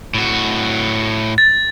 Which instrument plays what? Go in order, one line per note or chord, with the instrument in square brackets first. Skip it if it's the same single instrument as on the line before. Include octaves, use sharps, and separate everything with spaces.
[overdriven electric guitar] A2 F#4
[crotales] A6